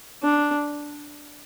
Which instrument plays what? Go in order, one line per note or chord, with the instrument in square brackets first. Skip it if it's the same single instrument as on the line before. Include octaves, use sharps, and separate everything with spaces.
[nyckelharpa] D4